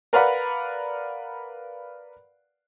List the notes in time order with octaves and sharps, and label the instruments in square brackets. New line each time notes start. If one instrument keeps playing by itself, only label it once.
[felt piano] A#4 B4 D5 F5 F#5 B5